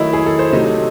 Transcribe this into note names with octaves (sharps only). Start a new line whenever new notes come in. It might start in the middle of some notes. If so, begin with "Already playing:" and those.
Already playing: D#3 F#3 A3 D#4 E4
G#4
A4
C5
C3 F#3 A3 D#4